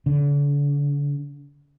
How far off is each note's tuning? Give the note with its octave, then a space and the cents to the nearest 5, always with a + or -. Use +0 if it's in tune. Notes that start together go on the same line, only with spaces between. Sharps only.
D3 -40